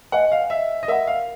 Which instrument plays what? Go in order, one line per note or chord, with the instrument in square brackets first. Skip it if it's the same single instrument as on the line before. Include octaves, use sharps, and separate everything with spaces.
[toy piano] B4 D#5 G#5 [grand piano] F#5
[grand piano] F5
E5
D#5
[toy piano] A#4 D5 F#5 B5 [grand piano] E5
[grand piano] F5